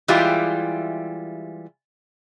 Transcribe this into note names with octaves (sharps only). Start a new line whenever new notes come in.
E3 G3 G#3 E4 F4 G4